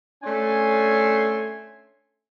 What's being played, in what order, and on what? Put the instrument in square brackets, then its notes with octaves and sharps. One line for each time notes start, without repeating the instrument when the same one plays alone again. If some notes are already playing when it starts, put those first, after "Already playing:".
[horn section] A3 C#4 D4 G#5 C6